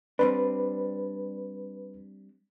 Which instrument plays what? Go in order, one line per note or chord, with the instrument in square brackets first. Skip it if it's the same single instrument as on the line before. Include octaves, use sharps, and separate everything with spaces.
[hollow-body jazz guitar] G3 C4 D4 [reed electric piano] B4